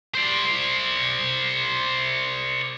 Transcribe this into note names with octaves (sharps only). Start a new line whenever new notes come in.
C5 D5